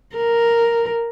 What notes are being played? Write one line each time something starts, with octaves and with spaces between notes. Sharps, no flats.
A#4